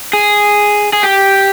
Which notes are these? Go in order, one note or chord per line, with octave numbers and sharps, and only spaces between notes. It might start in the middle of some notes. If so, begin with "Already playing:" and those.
G#4
G#4
G4